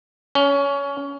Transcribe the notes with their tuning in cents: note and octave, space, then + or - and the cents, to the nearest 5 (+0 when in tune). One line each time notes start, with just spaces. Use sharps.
C#4 +20